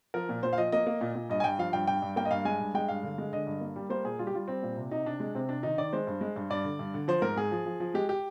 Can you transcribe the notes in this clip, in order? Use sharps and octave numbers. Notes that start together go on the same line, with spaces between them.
F3 A#4
A#2
A#2 C5
F5
F3 D#5
A#3 D#5
A#3
A#2
A#2
G2 D#5
G#5
G2 G5
F3 F5
G2 G5
G2 G5
G2
A#3 G5
D#5
G2 F5
G#3 G#5
G2
G#3 G5
G2 F5
D3
G#3
D3 D#5
G2
A#3
G3
A#3 C5
A#2 G#4
G3 F4
G4
G3 F4
G3 C4
A#2
C3
C3 D#4
C3 D4
G#3
C3 C4
C3 D4
D#3 D#4
D#3 D5
G#3 C5
G2
G#3
G2
G2 D5
D3
G2
D3
F3 C5
G#2 A#4
G#2 G#4
F3
F3
F3
G#3 G4
G4